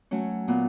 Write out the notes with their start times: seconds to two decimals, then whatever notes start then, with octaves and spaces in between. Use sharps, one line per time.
0.11 F#3 A3 C#4
0.48 A#2 B3